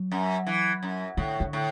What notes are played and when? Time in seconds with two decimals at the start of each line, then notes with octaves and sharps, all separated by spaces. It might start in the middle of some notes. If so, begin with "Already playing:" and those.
Already playing: F#3
0.12 F#2
0.47 E3
0.83 F#2
1.17 A2 D3
1.40 D3
1.53 A2